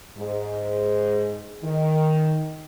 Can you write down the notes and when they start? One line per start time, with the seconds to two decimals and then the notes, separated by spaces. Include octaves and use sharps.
0.18 G#2
1.64 D#3